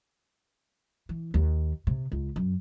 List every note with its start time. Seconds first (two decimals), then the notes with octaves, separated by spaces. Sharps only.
1.09 E3
1.34 D#2
1.87 C3
2.12 C#2
2.36 F#2